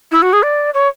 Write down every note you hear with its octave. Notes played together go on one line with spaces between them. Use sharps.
E4
F#4
G#4
D5
C#5